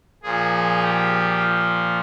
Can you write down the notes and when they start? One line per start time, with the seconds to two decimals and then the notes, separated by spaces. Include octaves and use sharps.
0.23 A#2 F3 G#4
0.81 G4
1.38 F4